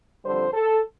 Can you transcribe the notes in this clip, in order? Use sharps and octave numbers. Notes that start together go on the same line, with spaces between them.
F2 D3 G3 C5
A4